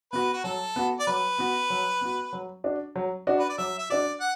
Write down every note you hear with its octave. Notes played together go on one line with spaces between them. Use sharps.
B3 F#4 B4
F#4
F#3 A4
B3 F#4
D5
F#3 B4
B3 F#4
F#3
B3 F#4
F#3
D4 F#4
F#3
D4 F#4
B4
D5
F#3 E5
E5
D4 F#4 D5
F#5